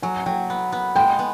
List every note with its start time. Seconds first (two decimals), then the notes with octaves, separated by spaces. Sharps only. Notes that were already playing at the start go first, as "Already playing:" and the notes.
0.02 F#3 G#5
0.26 F#3 G5
0.50 B3
0.72 B3
0.96 G#3 G5
1.19 B3